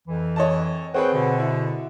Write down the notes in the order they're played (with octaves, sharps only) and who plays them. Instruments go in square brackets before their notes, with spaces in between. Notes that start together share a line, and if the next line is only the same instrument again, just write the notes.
[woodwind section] F2 E3
[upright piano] C#5 D#5 A5
[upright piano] C4 G#4 B4 [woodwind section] C#5 F#5 G5
[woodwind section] B2 D3
[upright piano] E4